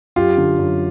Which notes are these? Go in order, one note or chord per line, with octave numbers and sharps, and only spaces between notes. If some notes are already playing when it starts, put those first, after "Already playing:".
F#2 F4 G4
D3
F#2